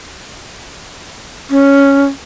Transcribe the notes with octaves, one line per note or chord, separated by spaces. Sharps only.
C#4